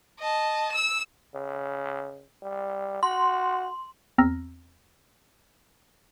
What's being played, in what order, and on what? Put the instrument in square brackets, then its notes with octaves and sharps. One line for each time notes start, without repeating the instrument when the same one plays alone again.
[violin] D#5 A5
E6 E7
[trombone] C#3
G3
[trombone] F#4 [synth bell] C6
[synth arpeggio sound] E2 C4 A#5 E6 F6 A#6